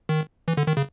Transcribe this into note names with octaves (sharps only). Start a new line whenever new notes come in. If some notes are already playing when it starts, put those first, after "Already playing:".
D#3
E3
D3
D#3
C#3